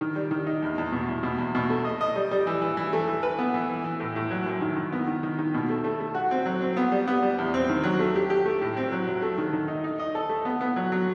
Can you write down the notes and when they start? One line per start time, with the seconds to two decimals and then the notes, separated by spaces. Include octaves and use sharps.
0.01 D#3
0.16 G3
0.31 D#3
0.47 D#4
0.62 E2
0.78 E2
0.92 B2
1.09 E2
1.23 B2
1.38 E2
1.55 B2
1.70 A3
1.85 D#5
2.01 D#5
2.16 G3
2.31 G3
2.47 E3
2.62 E3
2.77 E3
2.93 A3
3.08 E3
3.23 B4
3.39 B3
3.54 E3
3.69 E3
3.84 E3
4.00 A2
4.16 A2
4.31 F#3
4.46 F#2
4.61 D#3
4.76 D#3
4.92 B3
5.07 D#3
5.23 D#3
5.38 D#3
5.54 B2
5.69 A3
5.84 A3
6.00 A3
6.14 F#4
6.31 C4
6.46 F#3
6.61 C4
6.77 B3
6.92 G3
7.08 B3
7.22 G3
7.38 E2
7.54 C4
7.69 D#3
7.84 F#3
8.00 A3
8.15 G4
8.30 G4
8.46 A3
8.62 A2
8.77 C4
8.92 F#3
9.07 F#3
9.22 A3
9.38 D#3
9.53 D#3
9.68 D#4
9.84 D#4
9.99 D#5
10.15 A4
10.29 A3
10.45 B3
10.61 B3
10.76 F#3
10.92 F#3